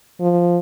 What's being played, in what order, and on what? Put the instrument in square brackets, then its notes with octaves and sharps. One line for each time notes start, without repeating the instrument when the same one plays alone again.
[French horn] F3